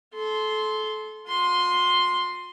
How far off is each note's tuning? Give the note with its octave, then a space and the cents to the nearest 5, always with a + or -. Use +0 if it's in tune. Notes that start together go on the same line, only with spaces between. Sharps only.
A4 -30 C6 +0
F4 +45 C6 +0